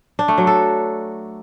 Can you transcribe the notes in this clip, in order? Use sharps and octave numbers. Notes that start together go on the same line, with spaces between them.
D4
A3
F#3
A4